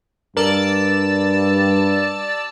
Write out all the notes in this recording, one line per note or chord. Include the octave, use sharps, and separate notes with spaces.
G2 A#4 D5 A5 E6